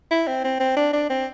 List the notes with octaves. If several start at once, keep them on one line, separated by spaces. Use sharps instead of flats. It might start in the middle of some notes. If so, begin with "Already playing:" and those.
E4
C4
C4
C4
D4
D4
C4